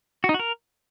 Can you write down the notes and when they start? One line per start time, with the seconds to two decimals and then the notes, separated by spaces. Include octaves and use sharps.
0.24 F#4
0.29 D#4
0.34 F#4
0.39 A#4